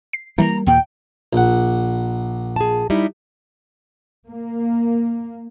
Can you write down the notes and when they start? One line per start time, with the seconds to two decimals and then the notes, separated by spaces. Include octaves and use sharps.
0.13 C7
0.38 E3 G3 G#3 A#3 A#5
0.67 D#2 A#2 A#3 G5
1.33 A#1 F#5
2.56 G#4 A5
2.90 G3 D#4 E4
4.28 A#3